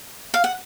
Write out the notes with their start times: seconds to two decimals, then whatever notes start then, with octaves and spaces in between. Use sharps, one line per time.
0.34 F5
0.44 F#5